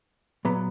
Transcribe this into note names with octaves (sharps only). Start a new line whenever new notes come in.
A#2 F#3 B3